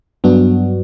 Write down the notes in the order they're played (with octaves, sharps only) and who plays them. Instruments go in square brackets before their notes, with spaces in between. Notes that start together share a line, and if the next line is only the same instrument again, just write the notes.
[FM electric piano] G2 F#3 B3 D4 F#4